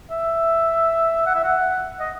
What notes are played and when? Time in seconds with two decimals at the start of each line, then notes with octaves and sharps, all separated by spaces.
0.11 E5
1.26 F#5
1.35 E5
1.44 F#5
2.00 D#5